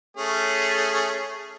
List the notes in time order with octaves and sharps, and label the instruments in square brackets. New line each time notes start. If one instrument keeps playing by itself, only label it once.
[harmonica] A3 C#4 G#4